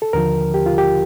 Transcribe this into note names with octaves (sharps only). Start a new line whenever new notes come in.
A4
D#2 D3 F3 A#4
G4
F4
G4